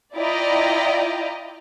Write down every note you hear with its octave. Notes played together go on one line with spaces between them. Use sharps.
E4 F4 D5 D#5 G5 A#5